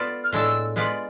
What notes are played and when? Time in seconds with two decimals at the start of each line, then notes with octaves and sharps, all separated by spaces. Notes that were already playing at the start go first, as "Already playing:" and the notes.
Already playing: B3 F4 A4 D5
0.24 F6
0.33 A2 G#3 D4 A4 E6
0.76 G#3 B3 F4 B4 D5